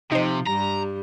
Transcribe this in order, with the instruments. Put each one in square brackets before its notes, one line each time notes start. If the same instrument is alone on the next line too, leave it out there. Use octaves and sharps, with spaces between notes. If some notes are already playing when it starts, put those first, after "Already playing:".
[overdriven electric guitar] C3 [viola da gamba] F3 [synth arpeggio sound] D#4 C5
[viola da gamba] G2 G3 [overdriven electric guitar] A#5